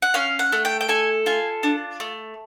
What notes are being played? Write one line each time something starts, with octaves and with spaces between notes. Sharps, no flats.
F#5
C#4 F5
F#5
A3
G5
G5
A4 G#5
F4 G#5
D4
A3